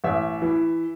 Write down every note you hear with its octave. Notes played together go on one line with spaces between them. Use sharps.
A1 E5
E3